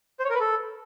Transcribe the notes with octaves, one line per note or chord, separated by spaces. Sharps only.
C5
C#5
A#4
B4
A4